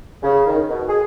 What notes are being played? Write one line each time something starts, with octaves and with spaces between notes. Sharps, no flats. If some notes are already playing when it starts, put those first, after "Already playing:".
C#3
D#3
B2
G#4